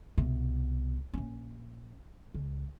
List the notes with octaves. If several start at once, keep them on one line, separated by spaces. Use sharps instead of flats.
C2 B2
A#1 C#4
C#2